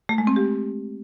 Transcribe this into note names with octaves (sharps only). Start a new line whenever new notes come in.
A3
G#3
C4
G4